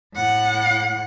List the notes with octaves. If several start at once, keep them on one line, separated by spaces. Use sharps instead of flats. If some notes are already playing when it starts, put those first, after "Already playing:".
A2 F#5